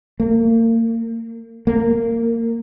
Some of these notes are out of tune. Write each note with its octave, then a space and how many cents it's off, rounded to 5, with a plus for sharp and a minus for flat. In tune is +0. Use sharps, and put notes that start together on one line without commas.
A#3 -35
A#3 -20